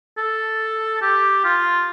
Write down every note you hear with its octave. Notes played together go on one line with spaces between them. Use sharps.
A4
G4
F4